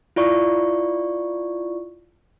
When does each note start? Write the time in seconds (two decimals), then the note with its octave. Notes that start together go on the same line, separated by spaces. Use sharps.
0.16 E4 F4 D5 C#6